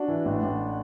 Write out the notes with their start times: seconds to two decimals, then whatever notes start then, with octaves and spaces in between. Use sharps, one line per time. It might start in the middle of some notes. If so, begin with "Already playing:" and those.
Already playing: D4 F#4
0.08 E3
0.25 A1
0.43 A1